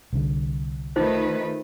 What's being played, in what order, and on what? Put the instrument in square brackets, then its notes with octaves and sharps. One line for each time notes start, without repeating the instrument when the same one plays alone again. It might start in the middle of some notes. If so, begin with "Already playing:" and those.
[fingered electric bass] C2 D3
[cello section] D#3 A3 B4 [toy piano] D#4 F4 C5